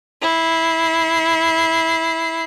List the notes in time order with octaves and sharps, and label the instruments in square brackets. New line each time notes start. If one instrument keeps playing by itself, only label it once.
[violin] E4 C7